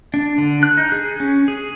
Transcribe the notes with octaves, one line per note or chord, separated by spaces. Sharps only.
D4
D3
F#6
D#4
G#4
C#4
G#4